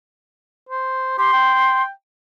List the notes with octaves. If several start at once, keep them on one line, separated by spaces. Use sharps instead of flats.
C5
G4 C6
G5